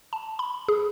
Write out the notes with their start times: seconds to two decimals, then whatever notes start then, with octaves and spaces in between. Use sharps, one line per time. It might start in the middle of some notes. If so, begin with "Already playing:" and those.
0.13 A5
0.39 B5
0.68 G#4